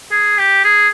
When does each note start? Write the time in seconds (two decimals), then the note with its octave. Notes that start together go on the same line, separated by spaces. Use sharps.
0.11 G#4
0.38 G4
0.64 G#4